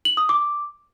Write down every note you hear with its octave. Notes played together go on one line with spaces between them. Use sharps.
F#7
D#6
D6